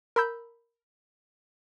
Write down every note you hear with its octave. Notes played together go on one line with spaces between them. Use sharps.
A#4 A#5 B5 E6 G6